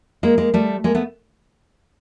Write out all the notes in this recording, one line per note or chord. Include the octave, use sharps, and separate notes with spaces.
G#3 A#3
G#3 A#3
G3 A3
G#3 A#3
A3 B3